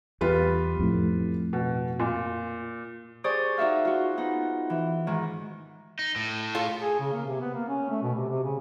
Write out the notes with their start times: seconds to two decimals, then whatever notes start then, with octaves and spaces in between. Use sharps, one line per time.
0.21 E2 G3 F4 B4
0.79 F2 A2
1.53 B2
2.00 A#2
3.24 G4 G#4 C5 D5 C#6 D#6
3.57 D#4 F#4 E5 F5
3.85 F4 F#4
4.17 B3 D#4
4.70 E3
5.07 G#2 D#3
5.99 D#4
6.16 A2
6.55 F4 A4 C#5
6.79 G#4
6.99 C#3
7.13 A#3
7.26 C3
7.41 B3
7.54 A#3
7.68 C#4
7.90 A3
8.03 B2
8.15 C3
8.28 C3
8.43 C#3